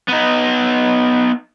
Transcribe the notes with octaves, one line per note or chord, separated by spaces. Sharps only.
B3 D#4